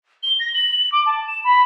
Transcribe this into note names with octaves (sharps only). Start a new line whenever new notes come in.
G7
A#6
F#7
D6
A5
E7
B5